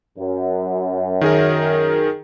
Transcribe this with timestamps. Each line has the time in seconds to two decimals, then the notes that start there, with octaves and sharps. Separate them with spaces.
0.18 F#2
1.21 D#3 G#4 A#4